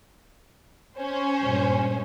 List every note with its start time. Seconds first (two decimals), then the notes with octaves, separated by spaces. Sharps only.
0.98 C#4 C5
1.42 G2 A#2 G#3